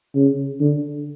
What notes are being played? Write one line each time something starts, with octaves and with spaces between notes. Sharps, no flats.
C#3
D3